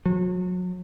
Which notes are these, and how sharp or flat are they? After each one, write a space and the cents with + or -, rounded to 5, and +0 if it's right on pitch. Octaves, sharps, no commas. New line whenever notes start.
F#3 -35